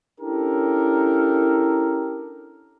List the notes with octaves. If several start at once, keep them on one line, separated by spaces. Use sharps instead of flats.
C#4 D4 E4 G4 A4 A#4